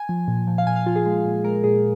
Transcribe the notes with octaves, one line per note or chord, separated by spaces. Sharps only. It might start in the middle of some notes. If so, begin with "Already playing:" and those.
Already playing: G#5
F3
A#2
F3
F5
A#2 G#5
F5
F3 F4
G#4
G#3
A#2
G#3 A#4
A#2 G#4